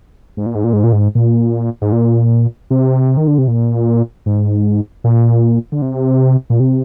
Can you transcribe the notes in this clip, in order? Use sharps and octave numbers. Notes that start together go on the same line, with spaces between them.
G#2
A#2
G#2
A#2
G#2
A#2
G#2
A#2
G#2
A#2
C3
D#3
D3
C3
A#2
G#2
A#2
D3
C3
A#2
C3